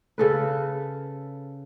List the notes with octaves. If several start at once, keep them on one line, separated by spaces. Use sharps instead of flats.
C#3 A4 B4